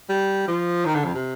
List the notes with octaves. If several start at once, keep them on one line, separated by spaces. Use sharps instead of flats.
G3
F3
D#3
D3
F2
C3